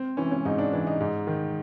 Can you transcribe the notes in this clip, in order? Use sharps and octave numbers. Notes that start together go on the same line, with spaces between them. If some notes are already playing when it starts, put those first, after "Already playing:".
Already playing: C4
E3 C#4
C#4
G#2 D#4
D4
E3 D4
D#4
G#2
D#3